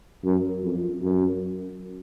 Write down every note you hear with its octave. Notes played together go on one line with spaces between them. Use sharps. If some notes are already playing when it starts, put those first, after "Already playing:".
F#2
F2
F#2